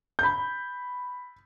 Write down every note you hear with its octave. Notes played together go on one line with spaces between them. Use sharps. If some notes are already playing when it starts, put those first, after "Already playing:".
B5 G6